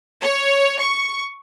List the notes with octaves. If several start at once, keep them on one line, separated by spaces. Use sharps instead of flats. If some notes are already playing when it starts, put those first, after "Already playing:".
C#5
C#6